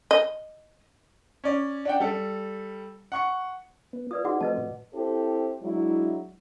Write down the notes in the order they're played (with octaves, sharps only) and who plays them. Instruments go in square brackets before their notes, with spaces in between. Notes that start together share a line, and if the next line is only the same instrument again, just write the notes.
[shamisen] D#5
[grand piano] C#4 D5
D4 F#5 G5
G3 A4
F#5 C#6 C#7
[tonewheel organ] B3
[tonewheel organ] F4 [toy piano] B4 D5 D#6
[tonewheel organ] D#4 G#4 [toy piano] F#4 F#5 D6
[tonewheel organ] F3 A3 C4 [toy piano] B4 D#5 A5
[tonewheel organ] A2
[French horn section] C4 E4 G4 A4 C5
F#3 G#3 D4 E4